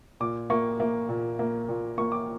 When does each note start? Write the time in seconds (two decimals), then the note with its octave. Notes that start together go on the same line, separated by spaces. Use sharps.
0.20 A#2 D6
0.50 A#3 C#6
0.80 A#3
1.09 A#2
1.39 A#3
1.69 A#2
1.98 A#3 C#6
2.12 D6